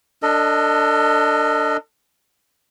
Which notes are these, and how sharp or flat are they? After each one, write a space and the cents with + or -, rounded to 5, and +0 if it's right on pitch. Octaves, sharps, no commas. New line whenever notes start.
D4 +0 A4 +35 D#5 +0